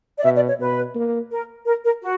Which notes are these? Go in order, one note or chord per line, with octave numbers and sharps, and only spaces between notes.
D5
B2 E5
D5
C#5
B2 B4
A#3
A#4
A#4
A#4
F#4